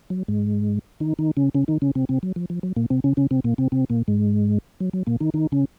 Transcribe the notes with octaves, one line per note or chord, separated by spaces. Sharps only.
F#3
G#2 G#3
D#3 D#4
D#3 D#4
C#3 C#4
C#3 C#4
D#3 D#4
C#3 C#4
C3 C4
C3 C4
F#3
F3
F3
F#3
A#2 A#3
C3 C4
C#3 C#4
C#3 C#4
C3 C4
A#2 A#3
C3 C4
C3 C4
A#2 A#3
G#2 G#3
F#3
F#3
A#2 A#3
D#3 D#4
D#3 D#4
C#3 C#4